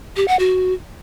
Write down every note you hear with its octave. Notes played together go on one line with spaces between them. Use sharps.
G4
F#5
F#4